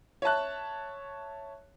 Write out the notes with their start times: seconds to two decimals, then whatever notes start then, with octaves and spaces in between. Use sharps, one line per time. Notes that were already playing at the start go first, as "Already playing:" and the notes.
0.22 C#5 E5 A5 F#6